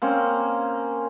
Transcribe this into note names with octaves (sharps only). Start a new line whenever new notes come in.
A#3 C4 C#4